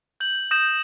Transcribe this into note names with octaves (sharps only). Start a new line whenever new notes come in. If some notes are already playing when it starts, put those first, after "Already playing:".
G6 F#7
D#6 G6 A#6 E7